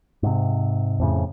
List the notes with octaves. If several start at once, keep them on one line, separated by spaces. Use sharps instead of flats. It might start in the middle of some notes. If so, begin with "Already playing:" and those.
G#2 C3
F2 A2 C#3